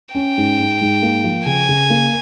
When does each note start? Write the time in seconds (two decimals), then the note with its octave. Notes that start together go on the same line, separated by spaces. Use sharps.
0.15 C#4 G5
0.38 G#2
0.59 G#2
0.81 G#2
1.03 A#3
1.24 F3
1.46 C#3 G#5
1.69 C#3
1.90 A#3